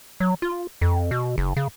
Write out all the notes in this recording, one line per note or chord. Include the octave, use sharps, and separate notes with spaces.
F#3
F4
F2
B2
F#1
C#3